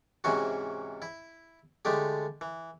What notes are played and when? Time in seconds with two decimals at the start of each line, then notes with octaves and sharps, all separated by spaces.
0.24 G#2 C3 E3 C#4 F#4
1.02 E4
1.85 D3 G#3 A3 G4
2.41 E3